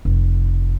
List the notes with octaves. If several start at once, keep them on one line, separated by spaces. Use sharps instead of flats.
F1